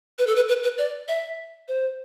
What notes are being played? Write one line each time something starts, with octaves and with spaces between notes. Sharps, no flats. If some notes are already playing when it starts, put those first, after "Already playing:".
B4
A4
B4
B4
B4
D5
E5
C5